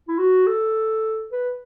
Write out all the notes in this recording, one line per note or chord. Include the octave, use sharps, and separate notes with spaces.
E4
F#4
A4
B4